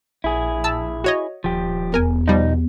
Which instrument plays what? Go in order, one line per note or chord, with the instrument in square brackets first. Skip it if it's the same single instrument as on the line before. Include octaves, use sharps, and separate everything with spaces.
[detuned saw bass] A#1 [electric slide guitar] E4 G#4
[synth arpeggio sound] A5 E6
F#4 C#5 D#5
[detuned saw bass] D#1 [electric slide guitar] F3 G4
[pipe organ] E2 [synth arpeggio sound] A#4 G#5
[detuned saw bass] B2 [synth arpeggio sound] F3 G3 [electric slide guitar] D#4